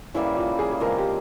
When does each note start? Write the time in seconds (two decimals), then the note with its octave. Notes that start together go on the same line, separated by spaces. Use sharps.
0.14 C#3 E3 G3 A#3 E4
0.37 F4
0.59 G#4
0.72 G#4
0.80 C#3 F3 G#3 C4 A#4
0.97 G4